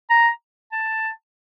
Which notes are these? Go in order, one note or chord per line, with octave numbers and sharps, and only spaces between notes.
A#5
A5